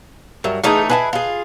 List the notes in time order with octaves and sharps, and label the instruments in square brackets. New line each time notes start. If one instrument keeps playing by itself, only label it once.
[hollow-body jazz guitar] G2 A#4 E5 [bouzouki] F#3
[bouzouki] E3 A3 D#4 [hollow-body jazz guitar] G#4 F5
[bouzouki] E4 F4 G#4 [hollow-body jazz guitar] B4 D#5 A5
[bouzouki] F4 G#4